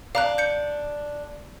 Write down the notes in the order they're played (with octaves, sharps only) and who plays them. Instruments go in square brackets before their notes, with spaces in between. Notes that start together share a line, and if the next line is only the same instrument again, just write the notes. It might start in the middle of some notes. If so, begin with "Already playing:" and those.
[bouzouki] D4 [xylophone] F5 A#5 F#6
[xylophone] G6 C#7